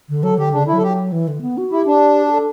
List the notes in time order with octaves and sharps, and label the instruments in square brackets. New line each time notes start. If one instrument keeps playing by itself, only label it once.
[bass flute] D3
[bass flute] F#3 [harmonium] A4
[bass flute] D3 [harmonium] G4
[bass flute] C#3 [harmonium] D4
[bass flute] D3 [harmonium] E4
[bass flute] F#3 [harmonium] A4
[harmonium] G4
[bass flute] E3
D3
B3
F#4
[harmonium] E4 [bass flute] G4
[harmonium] D4
[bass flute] G4
A4